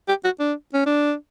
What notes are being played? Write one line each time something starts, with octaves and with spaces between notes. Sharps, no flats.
G4
F#4
D4
C#4
D4